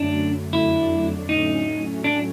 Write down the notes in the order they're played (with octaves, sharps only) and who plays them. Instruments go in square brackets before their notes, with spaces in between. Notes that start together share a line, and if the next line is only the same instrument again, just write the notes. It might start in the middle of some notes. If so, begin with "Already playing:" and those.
Already playing: [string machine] F#2 D3 F#3 A3 [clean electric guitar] D4
[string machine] F2 D3 F#3 A3 D4 [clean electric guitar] E4
[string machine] A2 F#3 A3 C#4 [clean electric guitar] D#4
[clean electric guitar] D4